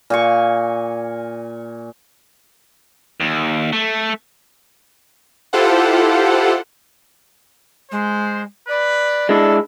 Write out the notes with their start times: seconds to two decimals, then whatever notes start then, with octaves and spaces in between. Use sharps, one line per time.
0.10 A#2 G#5 C#6
3.20 D#2
3.73 A3
5.53 E4 F4 G4 A4 C5 F#5
7.91 G#3 C5
8.68 B4 D5
9.29 G#3 D4 E4 A4